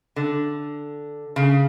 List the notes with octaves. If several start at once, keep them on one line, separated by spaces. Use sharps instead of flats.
D3
C#3